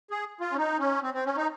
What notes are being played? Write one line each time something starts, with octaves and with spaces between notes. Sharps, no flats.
G#4
F4
C#4
D#4
C#4
C4
C4
C#4
D#4